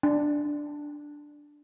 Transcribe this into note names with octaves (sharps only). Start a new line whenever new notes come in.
D4